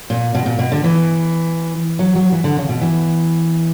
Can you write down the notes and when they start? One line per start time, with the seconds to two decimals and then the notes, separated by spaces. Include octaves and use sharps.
0.10 A#2
0.35 B2
0.46 A#2
0.59 B2
0.72 D3
0.84 E3
1.99 F#3
2.15 F#3
2.32 E3
2.44 D3
2.57 C#3
2.69 B2
2.81 E3